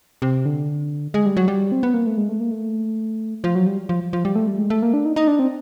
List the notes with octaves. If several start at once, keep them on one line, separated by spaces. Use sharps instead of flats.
C3
D3
G#3
G3
F#3
G3
C4
B3
A#3
A3
G#3
A3
A#3
A3
F3
F#3
G3
F3
F3
G3
A3
G3
G#3
A3
A#3
D4
D#4
D#4
D4
C4